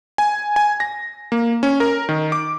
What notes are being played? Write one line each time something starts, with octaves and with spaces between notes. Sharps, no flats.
G#5
G#5
A#6
A#3
C#4
A#4
D#3
D6